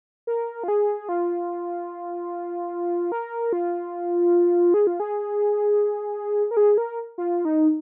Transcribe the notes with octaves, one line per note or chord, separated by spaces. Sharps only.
A#4
F4
G#4
F4
A#4
F4
G#4
F4
G#4
A#4
G#4
A#4
F4
D#4